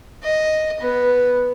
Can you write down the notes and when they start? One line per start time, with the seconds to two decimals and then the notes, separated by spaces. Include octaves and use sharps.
0.23 D#5
0.80 B3